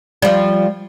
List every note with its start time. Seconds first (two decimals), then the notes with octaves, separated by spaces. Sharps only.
0.22 F3 G3